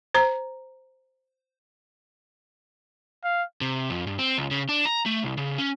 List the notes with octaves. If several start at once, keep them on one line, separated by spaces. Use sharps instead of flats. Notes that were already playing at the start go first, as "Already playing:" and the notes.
C5 A#5
F5
C3
F2
G2
C4
C#2
C#3
D4
A#5
A3
C2
C#3
C#4